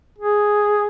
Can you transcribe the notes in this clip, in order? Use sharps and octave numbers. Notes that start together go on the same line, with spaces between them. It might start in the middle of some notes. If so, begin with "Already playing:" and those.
G#4